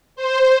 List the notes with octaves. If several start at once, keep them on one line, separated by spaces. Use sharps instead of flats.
C5